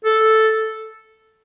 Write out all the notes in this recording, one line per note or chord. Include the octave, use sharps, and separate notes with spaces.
A4